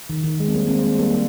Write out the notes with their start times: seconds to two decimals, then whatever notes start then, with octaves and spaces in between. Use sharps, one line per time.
0.09 D#3
0.24 D#3
0.40 G#3
0.48 C4
0.54 G3 A#3
0.69 G#3 C4
0.83 G#3 C4
0.98 G3 A#3
1.13 G3